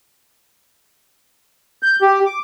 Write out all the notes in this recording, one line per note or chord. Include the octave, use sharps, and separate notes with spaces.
G6
G4
D6